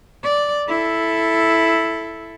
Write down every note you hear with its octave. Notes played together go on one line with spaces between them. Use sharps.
D5
E4 A4